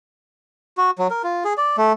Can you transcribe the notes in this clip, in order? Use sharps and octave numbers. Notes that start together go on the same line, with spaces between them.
F#4
F#3
A#4
F4
G#4
D5
A3